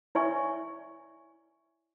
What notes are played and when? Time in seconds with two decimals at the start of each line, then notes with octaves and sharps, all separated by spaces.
0.15 E4 C#5 D5 E5 G#5 C#6